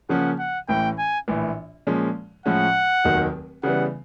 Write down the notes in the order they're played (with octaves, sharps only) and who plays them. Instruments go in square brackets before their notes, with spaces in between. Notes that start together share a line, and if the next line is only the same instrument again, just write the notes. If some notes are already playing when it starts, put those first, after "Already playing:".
[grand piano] C#3 F3 A#3 C#4 [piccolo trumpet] F#5
[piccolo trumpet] F#5
[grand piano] A1 A2 E3 [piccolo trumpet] G5
[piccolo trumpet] G#5
[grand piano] A#1 A2 E3
A#2 F3 G#3 C#4
[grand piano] A2 F3 G#3 C#4 [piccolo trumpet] F#5
[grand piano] F1 D#2 D#3 F#3
[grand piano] C#3 E3 G3 B3 [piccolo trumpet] F#5